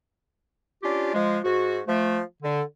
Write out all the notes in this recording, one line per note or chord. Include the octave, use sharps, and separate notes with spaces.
C#4 D4 F4 G4
F3 G#3
G#2 F#4
F3 A3
D3